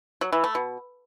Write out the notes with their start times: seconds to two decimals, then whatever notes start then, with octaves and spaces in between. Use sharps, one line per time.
0.21 F#3
0.33 E3
0.44 A3
0.55 B2